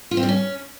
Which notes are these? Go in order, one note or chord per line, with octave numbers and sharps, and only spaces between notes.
F4
C4
G3
C#4